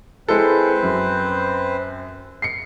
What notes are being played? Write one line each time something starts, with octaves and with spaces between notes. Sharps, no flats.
G#3 C4 E4 A4 B4 C5
F#2
C7 C#7